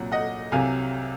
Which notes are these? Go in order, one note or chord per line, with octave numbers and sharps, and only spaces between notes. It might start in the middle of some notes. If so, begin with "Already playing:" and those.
Already playing: C2 A#2 F#3 F#5
D#5 F#5
C2 C3 F#3 F5 G#5